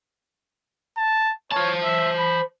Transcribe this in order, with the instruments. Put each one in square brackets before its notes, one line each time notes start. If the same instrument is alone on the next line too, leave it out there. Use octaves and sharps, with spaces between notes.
[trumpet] A5
[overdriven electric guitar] C5 A5 [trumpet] C#5
[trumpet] E5
B5